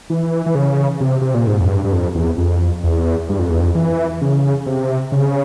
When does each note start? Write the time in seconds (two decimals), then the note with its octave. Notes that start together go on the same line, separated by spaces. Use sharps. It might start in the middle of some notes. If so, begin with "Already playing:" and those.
0.10 E3
0.46 E3
0.55 C#3
1.01 C3
1.21 C3
1.34 A#2
1.47 G#2
1.60 F2
1.69 G2
1.84 G2
1.92 F2
2.15 E2
2.38 F2
2.84 E2
3.29 G2
3.39 F2
3.50 E2
3.60 F2
3.75 E3
4.21 C#3
4.66 C3
5.12 C#3